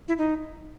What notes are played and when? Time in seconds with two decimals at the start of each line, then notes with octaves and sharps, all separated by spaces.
0.08 E4
0.18 D#4